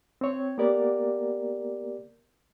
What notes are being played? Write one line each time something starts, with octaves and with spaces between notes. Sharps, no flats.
C4 C#5
A#3 B3 G4 A#4 D5